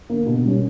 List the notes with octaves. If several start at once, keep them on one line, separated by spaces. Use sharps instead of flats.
D3 A#3
B2
G3 C#4